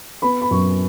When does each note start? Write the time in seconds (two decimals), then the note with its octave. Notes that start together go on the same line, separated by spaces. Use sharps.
0.22 B3 B5
0.42 B5
0.51 F#2 C#6